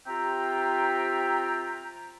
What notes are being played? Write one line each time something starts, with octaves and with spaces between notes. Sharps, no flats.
C4 F4 G4 E5 G5 A#5